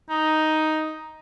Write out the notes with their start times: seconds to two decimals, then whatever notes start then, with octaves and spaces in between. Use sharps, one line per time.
0.09 D#4